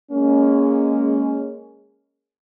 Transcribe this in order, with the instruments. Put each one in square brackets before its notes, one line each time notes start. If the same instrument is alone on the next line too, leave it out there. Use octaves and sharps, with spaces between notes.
[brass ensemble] G#3 A#3 C#4